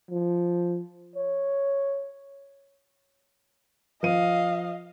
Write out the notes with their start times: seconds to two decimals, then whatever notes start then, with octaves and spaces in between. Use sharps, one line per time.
0.11 F3
1.16 C#5
4.03 F3 D#5 F5 D#7